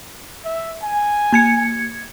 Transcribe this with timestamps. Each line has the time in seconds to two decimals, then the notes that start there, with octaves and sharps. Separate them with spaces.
0.45 E5
0.82 G#5
1.32 A#3 G#6 C#7